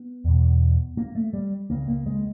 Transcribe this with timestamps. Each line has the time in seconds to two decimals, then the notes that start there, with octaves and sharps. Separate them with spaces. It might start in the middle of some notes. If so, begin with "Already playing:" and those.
Already playing: B3
0.24 E2 B2
0.97 A#3
1.15 A3
1.33 G3
1.70 C#2 C#3 A#3
1.88 A#3
2.06 G#3